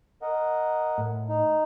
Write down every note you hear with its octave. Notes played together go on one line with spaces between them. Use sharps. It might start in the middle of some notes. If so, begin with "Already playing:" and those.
A#4 D#5 F#5
A2
D#4